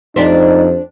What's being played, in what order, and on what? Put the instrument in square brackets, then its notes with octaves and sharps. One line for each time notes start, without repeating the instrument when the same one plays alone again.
[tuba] F2 [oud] D4 G4 C5 [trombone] D#4